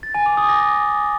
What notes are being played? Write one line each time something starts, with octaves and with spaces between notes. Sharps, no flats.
A6
G#5
D6
D#6
A#6